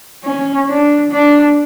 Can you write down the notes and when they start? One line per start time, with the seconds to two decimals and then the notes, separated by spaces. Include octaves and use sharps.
0.24 C#4
0.68 D4
1.11 D4